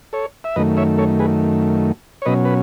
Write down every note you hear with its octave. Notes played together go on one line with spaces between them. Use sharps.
A4 C#5
E5
F#2 D#3 A3 B4 D#5
C#5 E5
A4 C#5
G#4 B4
C#5
B2 F#3 C#4 B4 D#5
B4